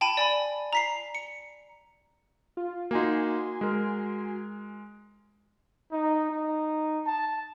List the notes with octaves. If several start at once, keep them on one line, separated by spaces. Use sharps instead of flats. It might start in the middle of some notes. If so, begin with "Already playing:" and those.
G5 A5 B5 D#7
D5 G#5 B5
A#5 B6 C7
C#7
F4
A#3 D#4 F#4 G#5 C6
G#3 A#4
D#4
D#4
A5